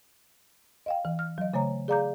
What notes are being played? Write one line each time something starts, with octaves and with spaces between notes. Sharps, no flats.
D#5 F5 G5
E3
F6
F#3 D#5
C#3 A3 C#5 A#5
G#4 D5 F5 A#5 D6 G6